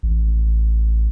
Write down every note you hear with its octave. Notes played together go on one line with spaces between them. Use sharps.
A1